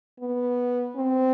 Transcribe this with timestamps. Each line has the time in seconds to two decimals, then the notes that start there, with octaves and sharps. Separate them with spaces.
0.20 B3
0.96 C4